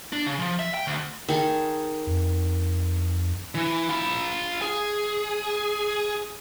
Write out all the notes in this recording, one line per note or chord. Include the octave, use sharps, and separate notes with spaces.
D4
C#3
F3
E5
G5
D2
D#3 G#4 A4
F2
E3
F4 B5
G#4